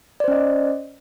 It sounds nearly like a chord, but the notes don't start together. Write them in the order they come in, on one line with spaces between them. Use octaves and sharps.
D5 C5 C#4 D#5